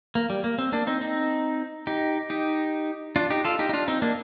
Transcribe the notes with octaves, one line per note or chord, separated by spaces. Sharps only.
A#3
G3
A#3
C4
A#3 D4
C4 D#4
C4 D#4
D#4 G4
D#4 G4
D4 F4
D#4 G4
F4 A4
D#4 G4
D#4
D4 F4
C4 D#4
A#3 D4